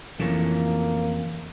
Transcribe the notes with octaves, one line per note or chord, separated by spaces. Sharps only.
F2 A2 C#3 E3 A#3 A4 C#5